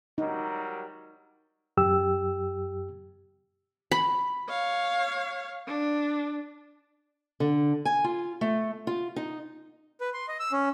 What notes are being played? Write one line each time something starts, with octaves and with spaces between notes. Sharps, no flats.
F#3 G3 D#4 A#4
F#2 G4 E6
B5
C#5 F5
D4
D3
G#5
F4
A3
F4
D#4
B4
C6
D#5
E6
C#4